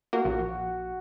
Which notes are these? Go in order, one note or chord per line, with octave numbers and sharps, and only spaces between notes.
A#3 F#4
A#1